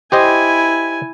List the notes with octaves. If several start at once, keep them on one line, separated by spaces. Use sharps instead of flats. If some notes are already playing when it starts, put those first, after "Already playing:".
E4 G4 C5 D#5 G#5